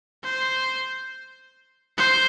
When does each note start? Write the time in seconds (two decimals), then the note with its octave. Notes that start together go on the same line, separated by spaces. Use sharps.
0.24 C5
1.98 C5